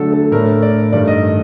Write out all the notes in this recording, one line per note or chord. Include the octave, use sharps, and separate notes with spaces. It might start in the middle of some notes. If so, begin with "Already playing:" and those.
Already playing: D3 F#3 A3 D4 A4
A4
A2 A3 D4 A#4
D5
G2 D#3 A3 D5
D#5